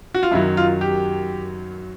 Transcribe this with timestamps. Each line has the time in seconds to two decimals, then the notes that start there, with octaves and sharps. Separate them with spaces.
0.14 F#4
0.23 F4
0.31 F#2 D#3 F#3 E4
0.57 F4
0.81 G4